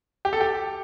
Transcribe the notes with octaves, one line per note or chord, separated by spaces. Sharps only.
G4
A4
G4